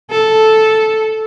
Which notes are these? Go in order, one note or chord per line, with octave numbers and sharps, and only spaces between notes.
A4